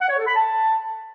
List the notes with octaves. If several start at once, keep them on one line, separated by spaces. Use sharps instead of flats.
F#5
C#5
A4
B5
A5